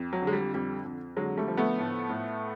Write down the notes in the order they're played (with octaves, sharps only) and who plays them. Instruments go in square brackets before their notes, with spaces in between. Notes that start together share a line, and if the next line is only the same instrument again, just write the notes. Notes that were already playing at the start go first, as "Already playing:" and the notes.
Already playing: [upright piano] F2
F#3
D3
G#3
G3
F2 G3
F2
D3 F#3 G#3
G3 A3
F3
A3 B3
A2
A2